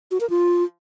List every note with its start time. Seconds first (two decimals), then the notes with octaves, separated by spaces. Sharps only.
0.11 F#4
0.21 A#4
0.30 F4